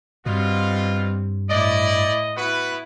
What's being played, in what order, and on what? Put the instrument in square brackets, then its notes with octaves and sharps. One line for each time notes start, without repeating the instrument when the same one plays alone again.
[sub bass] G2 [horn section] B2 F4 [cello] G3 C4
[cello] A2 E4 [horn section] D5 [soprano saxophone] D#5
[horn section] B3 F#4 B4 [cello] E4